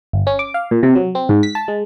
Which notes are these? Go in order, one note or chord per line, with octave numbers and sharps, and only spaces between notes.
G1
C#4
D6
F5
A#2
C3
F#3
C4
G#2
B6
A5
G#3